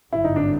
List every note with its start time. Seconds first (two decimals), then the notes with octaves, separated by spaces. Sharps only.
0.12 G#1 G2 D3 F#3 E4
0.24 D#4
0.36 D4